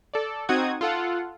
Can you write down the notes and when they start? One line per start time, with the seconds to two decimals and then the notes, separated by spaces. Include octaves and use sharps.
0.14 A4 D5
0.49 C4 D#4 F#4 F#5 D#6 G#6
0.81 F4 A4 F#5